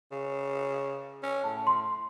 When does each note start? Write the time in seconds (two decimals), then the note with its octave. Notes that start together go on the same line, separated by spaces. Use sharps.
0.11 C#3
1.23 C#4
1.44 A2 A5
1.67 C6